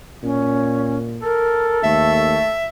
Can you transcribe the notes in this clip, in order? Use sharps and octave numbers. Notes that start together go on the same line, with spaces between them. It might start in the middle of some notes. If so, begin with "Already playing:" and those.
A#2 C#4
A4 A#4
D#2 A3 E5